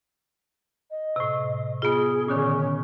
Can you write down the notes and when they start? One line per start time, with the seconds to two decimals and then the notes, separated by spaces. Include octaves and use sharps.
0.91 D#5
1.16 A2 C3
1.82 B3 F4 G#4
2.28 A#2 D3 D#3 C#4